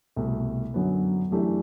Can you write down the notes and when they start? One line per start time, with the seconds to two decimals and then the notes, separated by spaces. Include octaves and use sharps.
0.16 C2 B2 A3
0.74 F#2 D3 F#3 B3
1.31 F#2 E3 A3 D4 G4